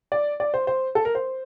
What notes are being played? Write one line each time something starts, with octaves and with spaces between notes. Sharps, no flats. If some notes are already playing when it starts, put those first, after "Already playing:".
D5
D5
C5
C5
A4
A#4
C5